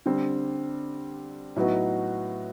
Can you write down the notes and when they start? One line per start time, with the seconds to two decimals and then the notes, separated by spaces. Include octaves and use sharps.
0.06 D3 G3 C4
1.56 A2 F#3 B3 D#4 F#4